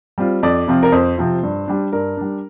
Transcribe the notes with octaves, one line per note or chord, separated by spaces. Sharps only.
G3 C4 F4
F2 D5
C3 F3 C4 F4
A#4
F2 C5
C3 F3 C4 F4
G2
G3 D4
G2 A#4
G3 D4